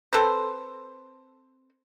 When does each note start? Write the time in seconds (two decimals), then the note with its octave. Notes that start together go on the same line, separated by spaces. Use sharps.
0.13 C4 A4 B4 C5